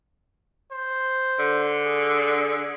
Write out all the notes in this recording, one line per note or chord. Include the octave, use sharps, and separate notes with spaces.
C5
D3
G#4